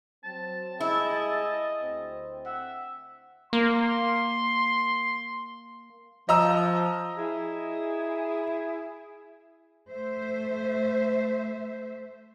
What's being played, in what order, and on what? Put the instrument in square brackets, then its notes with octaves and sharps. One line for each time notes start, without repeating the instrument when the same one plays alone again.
[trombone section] F#3 C4 [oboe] A5
[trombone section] C2 G#3 G#4 [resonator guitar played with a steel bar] E4 [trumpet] D#5
[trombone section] D2 C4
[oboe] E5 [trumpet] F#5
[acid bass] A#3 [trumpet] C6
[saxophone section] F3 [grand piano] D#5 A#5 E6
[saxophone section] E4 G#4
[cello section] A3 C5 E5